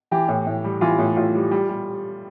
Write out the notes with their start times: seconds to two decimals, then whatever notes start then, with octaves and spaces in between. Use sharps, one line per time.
0.11 E3 G4
0.28 A2
0.47 A2
0.64 G3
0.81 E3 F4
0.99 A2
1.17 A2 F4
1.35 G3
1.51 G3
1.69 G3